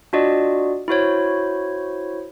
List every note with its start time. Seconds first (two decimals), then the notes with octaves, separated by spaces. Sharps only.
0.13 D4 F4 F#4 D5 D#5
0.88 E4 F#4 C5 C#5